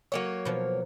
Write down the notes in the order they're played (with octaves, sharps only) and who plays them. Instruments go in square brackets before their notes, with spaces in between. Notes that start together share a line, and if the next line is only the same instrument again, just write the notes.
[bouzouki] F#3 A#3 C#5
[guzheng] B2 F3